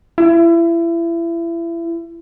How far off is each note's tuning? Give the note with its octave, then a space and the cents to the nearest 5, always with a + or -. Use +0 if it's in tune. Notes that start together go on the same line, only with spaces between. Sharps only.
E4 +30